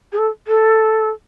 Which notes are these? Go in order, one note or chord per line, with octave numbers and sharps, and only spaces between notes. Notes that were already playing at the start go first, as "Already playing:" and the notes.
G#4
A4
A4